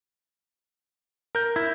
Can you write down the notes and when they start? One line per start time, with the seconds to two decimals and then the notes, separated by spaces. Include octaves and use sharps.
1.35 A#4 G6
1.56 E4